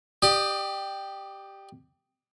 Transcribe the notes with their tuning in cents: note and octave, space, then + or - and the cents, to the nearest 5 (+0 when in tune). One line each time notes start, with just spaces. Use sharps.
G4 +0 D5 +30 D#6 +0